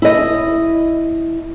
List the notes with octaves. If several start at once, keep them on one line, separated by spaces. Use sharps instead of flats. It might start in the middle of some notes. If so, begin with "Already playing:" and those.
E4 D#5